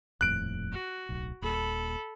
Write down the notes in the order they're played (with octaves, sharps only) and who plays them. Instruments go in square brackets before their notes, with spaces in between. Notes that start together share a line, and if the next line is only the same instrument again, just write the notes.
[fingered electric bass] D#1 F2 A2 [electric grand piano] F#6 D7
[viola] F#4
[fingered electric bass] D1 B1
[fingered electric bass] D#1 A#2 [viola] A4 B5